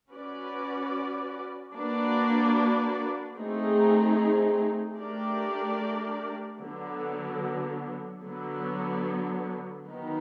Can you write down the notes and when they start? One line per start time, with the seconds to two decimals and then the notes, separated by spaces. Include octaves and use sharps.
0.11 C#4 F#4 B4 D5
1.74 A#3 D4 F#4 B4 D5
3.37 A3 C4 D#4 G#4
4.98 A3 D4 G4 A#4 D5
6.61 D3 F#3 B3
8.23 D3 F#3 B3
9.87 D#3 F#3 B3 D#4